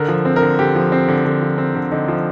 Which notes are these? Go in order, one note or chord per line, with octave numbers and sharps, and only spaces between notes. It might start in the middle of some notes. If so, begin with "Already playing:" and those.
Already playing: D3 A#4
F3
C4
A#4
D3
D3 G4
F3
C4
D3
D3
F3
C4
D3
D3 D#4
F3